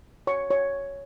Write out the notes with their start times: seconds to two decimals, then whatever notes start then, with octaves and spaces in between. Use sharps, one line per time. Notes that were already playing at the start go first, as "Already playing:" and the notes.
0.27 C#5 C#6
0.50 C#5 C#6